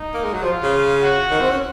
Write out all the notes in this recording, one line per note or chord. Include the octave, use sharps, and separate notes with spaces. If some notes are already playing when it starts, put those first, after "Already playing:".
Already playing: D#4
A#3
G#3
F#3
F3 F4
C#3
F#4
D#3
C4
C#4